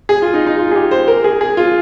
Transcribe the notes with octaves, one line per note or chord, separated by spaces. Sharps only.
G#4
F4
D#4
D#4
F4
G#4
G4
C5
A#4
G#4
G#4
F4